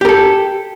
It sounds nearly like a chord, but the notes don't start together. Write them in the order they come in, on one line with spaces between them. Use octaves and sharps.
G4 A#4 A4